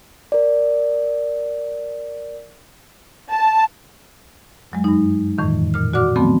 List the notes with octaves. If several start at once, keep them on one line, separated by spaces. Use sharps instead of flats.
A#4 D5
A5
F#2 F#3 G#3
G2 D#4
F2 A2 D#3 E3
A#2 F6
F#4 D5 F#5 D6 F6
D#3 F3 F#3 A3 B3 C4